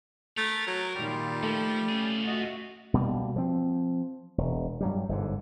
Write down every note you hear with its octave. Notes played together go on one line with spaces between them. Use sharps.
A3 A#4
F#3
A#2 D#3 G3 F4
F3 A3
C#4 F4 G#4
F#4 D#5 E5
B2 G3 A#3
F3 C4
E1
G2 F#3 G3
G1 G#2 D3